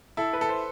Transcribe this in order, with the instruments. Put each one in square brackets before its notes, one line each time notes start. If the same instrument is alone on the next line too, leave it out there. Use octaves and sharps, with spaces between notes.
[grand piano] E4 [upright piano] A4
[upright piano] B4
[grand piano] A4
[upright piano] C5